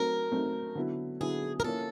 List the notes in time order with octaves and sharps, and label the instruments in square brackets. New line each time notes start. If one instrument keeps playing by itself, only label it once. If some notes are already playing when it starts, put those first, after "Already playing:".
Already playing: [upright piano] F#3 A3 C4 D#4 [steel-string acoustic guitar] A#4
[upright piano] F#3 A3 C4 D#4
D3 F#3 B3 E4
[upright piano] D3 F#3 B3 E4 [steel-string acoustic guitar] G#4
[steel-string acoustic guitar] A#4
[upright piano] F3 A#3 C#4 E4 [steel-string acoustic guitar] A4